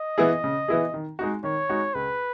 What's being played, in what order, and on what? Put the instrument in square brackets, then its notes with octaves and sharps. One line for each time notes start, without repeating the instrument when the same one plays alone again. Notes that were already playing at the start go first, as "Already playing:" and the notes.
Already playing: [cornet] D#5
[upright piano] E3 B3 E4 G#4
C#3
E3 B3 E4 G#4
D#3
G#3 D#4 F#4
[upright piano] D#3 [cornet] C#5
[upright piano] G#3 D#4 F#4
[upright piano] C#2 [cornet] B4